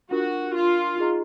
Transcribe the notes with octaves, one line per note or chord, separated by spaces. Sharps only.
D4 F4 F#4 A#4
F4
D#4 G#4 D#5 A#5